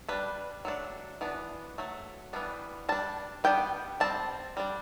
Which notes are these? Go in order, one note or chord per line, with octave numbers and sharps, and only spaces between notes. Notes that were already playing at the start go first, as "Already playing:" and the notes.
G3 D4 B4
F#3 A3 D4
E3 B3 D4
F#3 A3
E3 G3 B3 D4
G3 D4 A5
G3 B3 D4 G5
G3 C4 A5
G3 D4